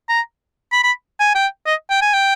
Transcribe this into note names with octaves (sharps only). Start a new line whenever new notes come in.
A#5
B5
B5
G#5
G5
D#5
G5
G#5
G5